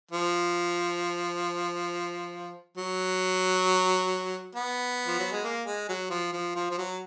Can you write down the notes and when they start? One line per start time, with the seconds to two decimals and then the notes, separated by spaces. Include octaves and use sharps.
0.11 F3
2.78 F#3
4.55 B3
5.07 F3
5.19 F#3
5.32 G#3
5.44 A#3
5.66 G#3
5.89 F#3
6.10 F3
6.33 F3
6.55 F3
6.71 F3
6.78 F#3